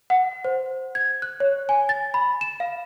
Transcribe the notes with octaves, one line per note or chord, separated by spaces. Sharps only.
F#5
C5
G#6
F#6
C#5
G#5
A6
B5
E7
F5